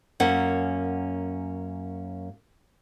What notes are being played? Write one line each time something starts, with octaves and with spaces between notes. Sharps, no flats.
F#2 A#3 C#4 F#5